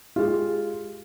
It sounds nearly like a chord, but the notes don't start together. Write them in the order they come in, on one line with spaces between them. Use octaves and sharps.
F4 G#3 G4